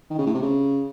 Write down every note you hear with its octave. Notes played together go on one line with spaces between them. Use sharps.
D#3
C#3
A2
C3
C#3